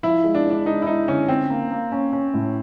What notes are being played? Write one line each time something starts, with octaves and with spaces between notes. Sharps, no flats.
F3 E4
G#3
D4
G#3
D4
G#3 D#4
E4
G#3 D#4
D3 C#4
C4 C#4
A#3
A#3
C#4
C#4
A2